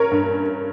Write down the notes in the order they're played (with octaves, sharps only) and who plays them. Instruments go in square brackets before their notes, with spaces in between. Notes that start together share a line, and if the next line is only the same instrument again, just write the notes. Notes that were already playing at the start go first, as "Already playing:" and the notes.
Already playing: [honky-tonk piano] C#4 A#4 C#5
G2